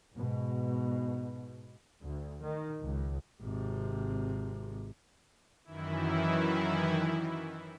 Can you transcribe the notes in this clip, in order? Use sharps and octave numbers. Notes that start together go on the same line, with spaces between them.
G#2 B2
D2
D#3
C#2
G#1 C3
F#2 D#3 E3 E4